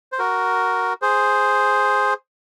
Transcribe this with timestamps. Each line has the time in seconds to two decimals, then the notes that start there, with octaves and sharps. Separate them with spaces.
0.12 C5
0.19 F#4 A#4
1.02 G#4 C5